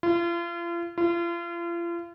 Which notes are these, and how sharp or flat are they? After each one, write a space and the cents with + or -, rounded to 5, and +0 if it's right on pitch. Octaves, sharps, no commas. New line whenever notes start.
F4 -40
F4 -40